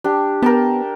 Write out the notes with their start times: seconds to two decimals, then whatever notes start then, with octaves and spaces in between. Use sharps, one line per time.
0.04 D4 G4
0.42 B3 A#4 G5 A5